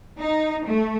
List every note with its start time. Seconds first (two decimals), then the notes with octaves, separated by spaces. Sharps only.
0.20 D#4
0.66 A3